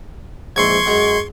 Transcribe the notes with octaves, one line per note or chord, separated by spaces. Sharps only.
A#1 G#2 E3 C6 C#6 G#6
F#2 G#3 A#5